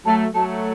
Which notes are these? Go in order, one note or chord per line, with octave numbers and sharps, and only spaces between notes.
F#3 A3 A5
F#3 A3 A5